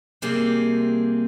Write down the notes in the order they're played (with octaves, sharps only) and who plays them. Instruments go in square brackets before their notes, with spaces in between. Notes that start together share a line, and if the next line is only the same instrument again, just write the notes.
[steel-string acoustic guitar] C3 G3 A#3 C4 G#4